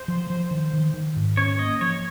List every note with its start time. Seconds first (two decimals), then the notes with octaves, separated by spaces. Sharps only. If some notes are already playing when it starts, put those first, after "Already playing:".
Already playing: C5
0.08 F3
0.30 F3
0.51 D#3
0.73 D#3
0.94 D#3
1.16 G#2
1.37 C#4 C#5
1.59 A#3 D#5
1.81 F3 C#5